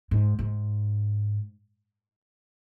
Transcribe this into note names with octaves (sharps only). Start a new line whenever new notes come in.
G#2
G#2